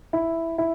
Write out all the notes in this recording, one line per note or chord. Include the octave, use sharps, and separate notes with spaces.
E4
E4